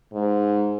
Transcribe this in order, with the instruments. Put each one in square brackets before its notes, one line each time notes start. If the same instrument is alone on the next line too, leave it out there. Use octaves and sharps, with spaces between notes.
[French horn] G#2